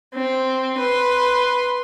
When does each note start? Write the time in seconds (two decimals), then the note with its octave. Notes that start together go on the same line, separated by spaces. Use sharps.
0.14 C4
0.78 B4 C6